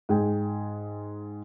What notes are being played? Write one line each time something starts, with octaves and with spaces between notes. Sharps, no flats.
G#2 G#4 G5